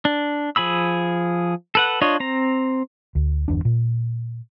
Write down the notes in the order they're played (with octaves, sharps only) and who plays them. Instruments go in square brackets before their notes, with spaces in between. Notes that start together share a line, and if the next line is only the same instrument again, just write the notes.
[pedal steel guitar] D4
F3 G#4 B5 E6
A4 B4 F#5
D4 F4 C#5 D#5
C4 A#5
[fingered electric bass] D2
G1 E2 D4
A#2